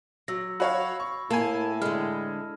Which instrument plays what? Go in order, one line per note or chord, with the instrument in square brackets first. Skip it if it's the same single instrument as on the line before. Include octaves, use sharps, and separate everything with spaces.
[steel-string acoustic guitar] F#3 [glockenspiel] E6 A#6
[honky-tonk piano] F#4 C#5 F5 [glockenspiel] B5
[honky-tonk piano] C#6
[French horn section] A2 E4 [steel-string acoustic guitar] A#3 [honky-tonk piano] G#5 A5
[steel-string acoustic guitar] D3 G#3 [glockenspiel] F6